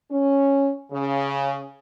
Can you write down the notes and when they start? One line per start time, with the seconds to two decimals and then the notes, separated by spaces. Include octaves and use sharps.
0.11 C#4
0.91 C#3